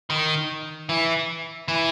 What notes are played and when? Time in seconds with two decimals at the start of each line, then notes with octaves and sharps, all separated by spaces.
0.10 D#3
0.89 E3
1.68 E3